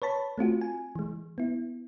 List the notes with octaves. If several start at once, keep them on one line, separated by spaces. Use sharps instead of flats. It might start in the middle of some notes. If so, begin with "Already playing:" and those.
B4 C#5 A5 B5
A3 C4 F4 F#4
G#5
E3 G#3
B3 E4